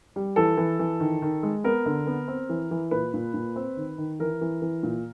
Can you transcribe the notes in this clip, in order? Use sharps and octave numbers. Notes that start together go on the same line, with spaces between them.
G3
E3 A4
E3
E3
D#3
D#3
G#3
B3 A#4
D3
B3
C4
E3
E3
A#2 B4
A#2
A#2
C4
D#3
D#3
E3 A#4
E3
E3
A#2